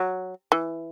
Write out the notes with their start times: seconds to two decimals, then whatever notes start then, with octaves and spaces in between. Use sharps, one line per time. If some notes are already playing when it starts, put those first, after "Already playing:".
Already playing: F#3
0.52 E3